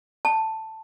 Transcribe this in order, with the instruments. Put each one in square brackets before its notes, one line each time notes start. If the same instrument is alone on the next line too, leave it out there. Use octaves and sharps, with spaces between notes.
[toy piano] A5